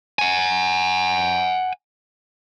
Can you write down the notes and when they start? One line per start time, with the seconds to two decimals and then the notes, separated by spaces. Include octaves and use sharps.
0.19 F#5 G#5